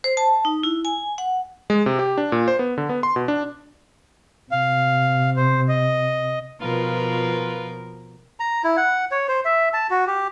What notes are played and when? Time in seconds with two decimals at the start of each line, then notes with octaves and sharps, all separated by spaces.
0.04 C5
0.17 A5
0.45 D#4
0.63 E4
0.85 G#5
1.18 F#5
1.70 G#3
1.86 C3
1.99 G4
2.18 D4
2.32 A#2
2.48 C5
2.59 B3
2.78 D3
2.89 B3
3.03 C6
3.16 B2
3.28 D4
4.51 C3 F5
5.36 C5
5.68 D#5
6.61 B2 F3 F4 A#4 B4
8.40 A#5
8.64 E4
8.77 F#5
9.11 C#5
9.28 C5
9.45 E5
9.73 A5
9.90 F#4
10.07 G4